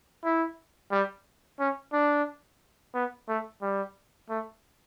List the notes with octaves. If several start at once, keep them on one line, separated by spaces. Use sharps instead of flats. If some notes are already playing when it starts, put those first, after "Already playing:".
E4
G3
C#4
D4
B3
A3
G3
A3